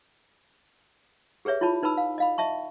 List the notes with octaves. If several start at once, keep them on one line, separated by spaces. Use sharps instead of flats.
G4 G#4 B4 C#5 E5
E4 F4 C#5 A5 B5
D#4 B4 A5 B5 E6
F5
D#5 F5 B5
D#5 E5 A5 C#6